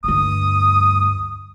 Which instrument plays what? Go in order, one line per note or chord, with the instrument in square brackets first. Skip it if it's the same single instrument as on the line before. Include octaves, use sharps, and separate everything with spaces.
[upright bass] D2 G2 [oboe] D#6